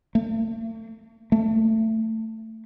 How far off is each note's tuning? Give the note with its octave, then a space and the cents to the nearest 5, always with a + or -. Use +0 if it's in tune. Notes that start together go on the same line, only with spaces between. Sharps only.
A3 +45
A3 +15